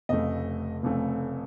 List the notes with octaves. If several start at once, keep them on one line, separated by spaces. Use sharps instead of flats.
F1 F2 C#3 A3 D#5
F1 F2 C#3 A3